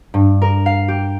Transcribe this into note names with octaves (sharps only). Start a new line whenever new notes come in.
G2
A#4
F5
G4